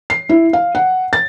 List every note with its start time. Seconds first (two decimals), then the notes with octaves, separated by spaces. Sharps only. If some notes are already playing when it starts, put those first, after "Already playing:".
0.10 C7
0.29 E4
0.53 F5
0.75 F#5
1.13 A6